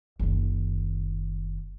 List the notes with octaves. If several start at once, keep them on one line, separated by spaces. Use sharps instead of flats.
F#1 D#3